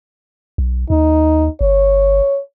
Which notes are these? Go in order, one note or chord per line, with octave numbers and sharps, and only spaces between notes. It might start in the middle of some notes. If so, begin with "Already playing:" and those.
B1
D#2 D#4
G1 C#5